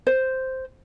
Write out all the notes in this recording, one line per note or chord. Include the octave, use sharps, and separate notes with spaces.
C5